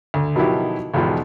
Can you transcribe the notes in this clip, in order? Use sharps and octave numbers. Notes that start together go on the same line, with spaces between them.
D2
B2 D#3 F3 F#3 E4 G4
B1 E2 G#2 B2 F3 G4